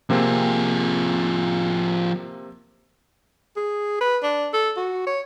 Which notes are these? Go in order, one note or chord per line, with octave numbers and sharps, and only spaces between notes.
C3 F3 A#3 C4 G#4
G#4
B4
D4
A4
F#4
C#5